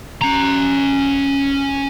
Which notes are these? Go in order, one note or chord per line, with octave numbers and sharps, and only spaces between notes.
C#4 A#5